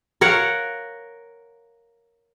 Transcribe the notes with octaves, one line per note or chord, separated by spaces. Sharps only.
A#4 C#5 F5 F#5